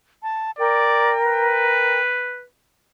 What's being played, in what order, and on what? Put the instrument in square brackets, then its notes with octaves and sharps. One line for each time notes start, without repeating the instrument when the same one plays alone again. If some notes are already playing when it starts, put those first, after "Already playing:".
[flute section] A5
[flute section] A#4 G5 [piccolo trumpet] D5
[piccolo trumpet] B4